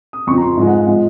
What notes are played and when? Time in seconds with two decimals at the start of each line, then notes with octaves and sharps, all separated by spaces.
0.13 D#6
0.27 F2 C#3 F3 C#6
0.38 A#5
0.42 C6
0.57 G#2 F3 G#3
0.67 F#5
0.78 F5
0.87 F3 G#3 D#5